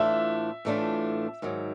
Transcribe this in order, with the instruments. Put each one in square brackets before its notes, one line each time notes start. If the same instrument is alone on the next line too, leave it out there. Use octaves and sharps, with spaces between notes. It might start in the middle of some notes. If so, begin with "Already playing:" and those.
Already playing: [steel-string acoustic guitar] A2 E3 A3 D4 F4 [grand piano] E5
[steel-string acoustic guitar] A2 E3 A3 D4 F4
G#2 D#3 F#3